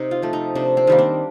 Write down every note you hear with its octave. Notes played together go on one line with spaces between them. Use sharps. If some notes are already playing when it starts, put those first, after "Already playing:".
Already playing: C3 D#4
F4
F3 A3
D#4
C3 D4
C4
D#3 G3 A#3
D4